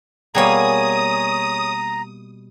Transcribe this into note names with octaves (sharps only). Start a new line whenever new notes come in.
B2 G3 A#3 G#4 C#5 A#5 D#6